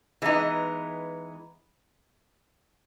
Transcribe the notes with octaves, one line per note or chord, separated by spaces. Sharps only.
E3 G#3 B3 D#4